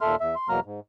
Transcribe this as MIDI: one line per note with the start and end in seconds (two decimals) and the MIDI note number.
0.01 0.16 39
0.01 0.16 46
0.01 0.16 69
0.01 0.16 76
0.01 0.16 84
0.01 0.16 89
0.20 0.35 40
0.20 0.35 76
0.36 0.49 84
0.49 0.60 40
0.49 0.60 47
0.49 0.60 54
0.49 0.60 58
0.49 0.60 82
0.49 0.60 89
0.65 0.80 44